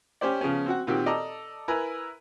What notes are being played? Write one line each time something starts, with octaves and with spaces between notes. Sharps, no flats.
C#4 G4 C5 D5
C#3 F3 B3 C#4
C4 F#4 F#5
A#2 D#3 C4 F#4 G4
A4 D5 D#5 A5 A#5
E4 A#4 B4 G#5 A#5